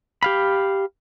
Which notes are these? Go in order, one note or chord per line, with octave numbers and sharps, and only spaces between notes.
G4 F5 B5